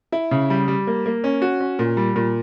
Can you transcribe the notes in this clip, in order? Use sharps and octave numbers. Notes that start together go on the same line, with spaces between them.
E4
C#3
G3
G3
A#3
A#3
C#4
F#4
C#4
A#2
G3
A#2